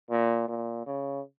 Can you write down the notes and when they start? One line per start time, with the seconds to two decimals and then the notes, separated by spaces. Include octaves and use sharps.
0.10 A#2
0.48 A#2
0.87 C#3